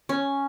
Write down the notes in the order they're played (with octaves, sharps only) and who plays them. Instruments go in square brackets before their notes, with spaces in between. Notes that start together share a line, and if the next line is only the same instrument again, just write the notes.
[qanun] C#4